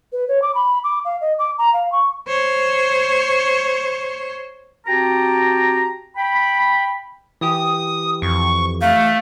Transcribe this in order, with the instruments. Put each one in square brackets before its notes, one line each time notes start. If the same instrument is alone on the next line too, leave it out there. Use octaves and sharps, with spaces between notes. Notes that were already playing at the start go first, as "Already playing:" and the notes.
[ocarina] B4
C#5
D6
B5
D6
F5
D#5
D6
A#5
F5
C#6
[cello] C5 C#5
[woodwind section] C4 F#4 G4 G5 A5 A#5
G5 B5
[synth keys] E3 G4 [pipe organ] D#6
[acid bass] F2 [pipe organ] C#6
[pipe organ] A3 [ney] F5